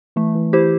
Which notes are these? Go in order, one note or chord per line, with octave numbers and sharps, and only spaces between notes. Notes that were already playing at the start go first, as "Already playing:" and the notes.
E3 A3
E3
E4 G4 C5